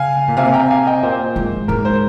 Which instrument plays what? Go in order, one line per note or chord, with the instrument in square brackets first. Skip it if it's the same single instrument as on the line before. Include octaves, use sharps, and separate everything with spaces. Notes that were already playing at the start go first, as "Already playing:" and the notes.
Already playing: [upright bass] C#3 [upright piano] F5 G#5
[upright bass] A#2
[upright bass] C3 [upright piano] F5 G#5
[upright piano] G5 A#5
F5 G#5
D#5 G5
[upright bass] A#2 [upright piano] C5
[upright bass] G#2
[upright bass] G#2 [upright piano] A#4
[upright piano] C5